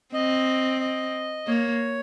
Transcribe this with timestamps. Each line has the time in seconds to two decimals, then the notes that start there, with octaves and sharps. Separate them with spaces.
0.13 C4 D#5
0.80 D#5
1.47 A#3 C#5